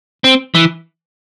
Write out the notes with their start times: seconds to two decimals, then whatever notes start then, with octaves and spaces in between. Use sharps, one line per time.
0.24 C4
0.55 E3